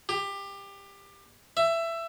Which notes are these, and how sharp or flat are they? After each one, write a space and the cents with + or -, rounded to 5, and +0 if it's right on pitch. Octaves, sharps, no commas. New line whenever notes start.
G4 +20
E5 +15